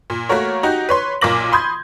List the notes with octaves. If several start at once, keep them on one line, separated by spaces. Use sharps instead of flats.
A#2
A3 A#3 F#4 A#4 C#5
D#4 F#4 G4
B4 C#5 C6
B1 A#2 A#3 D6 A#6 F#7
B5 C6 D#6 G6 G#6